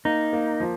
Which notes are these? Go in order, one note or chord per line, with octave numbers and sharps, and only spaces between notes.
A#3 D#4
A#3
F3